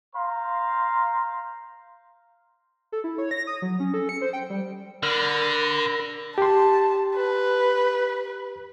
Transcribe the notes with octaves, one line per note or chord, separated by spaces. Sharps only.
C5 F5 A#5 C6
A4
E4
C#5
A#6
D#6
F#3
C#4
A4
C#7
C5
G5
G3
D3 A#4 B5 A#6
G4 A5 C6
B4